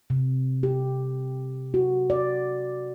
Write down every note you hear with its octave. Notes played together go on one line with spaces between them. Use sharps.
C3
G4
F#4
D5